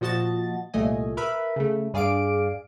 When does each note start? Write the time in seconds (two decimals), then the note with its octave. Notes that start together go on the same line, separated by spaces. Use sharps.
0.01 A#2 F3 F#4 D#5 A5 A6
0.74 C2 A#2 A3 D#5 G#5
1.17 A#4 B4 E5 B5
1.56 C#3 A3
1.94 G2 G#4 D5 F5 D6 D7